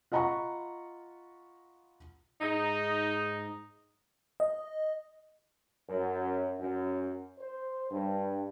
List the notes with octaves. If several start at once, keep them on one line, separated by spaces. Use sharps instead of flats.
F4 D#5 F#5 A#5 B5 C#6
G#2 D#4
D#5
F#2
F#2
C5
G2